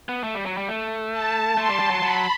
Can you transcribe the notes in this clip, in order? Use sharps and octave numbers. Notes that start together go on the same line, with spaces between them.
B3
A3
G3
F#3
G3
A3
A5
A3 C6
G3
G3
F#3
F#3 B5